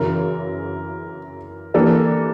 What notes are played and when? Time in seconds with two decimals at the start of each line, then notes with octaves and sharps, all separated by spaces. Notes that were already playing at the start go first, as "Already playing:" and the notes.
Already playing: F#2 C#3 E3 A#4
1.74 E3 G3 A#3 D4 A4